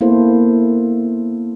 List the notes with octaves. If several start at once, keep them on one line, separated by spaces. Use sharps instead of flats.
A#3 B3 E4 A4 C5